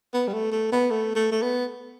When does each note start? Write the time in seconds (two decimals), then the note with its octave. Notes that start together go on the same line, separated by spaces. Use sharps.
0.13 B3
0.28 G3
0.34 A3
0.52 A3
0.72 B3
0.91 A3
1.15 A3
1.31 A3
1.42 B3